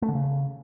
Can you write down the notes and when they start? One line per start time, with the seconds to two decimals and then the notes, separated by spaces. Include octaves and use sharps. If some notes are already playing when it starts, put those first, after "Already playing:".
0.02 A3
0.09 D3
0.15 C#3